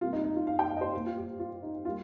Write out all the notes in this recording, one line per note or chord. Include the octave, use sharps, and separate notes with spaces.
C3 G3 A#3 F4
D#4
D#4
F4
F5
G5
F5
D#5
C5
A#2 A#3
F4
G4
F4
D#4
G3 A#3 F4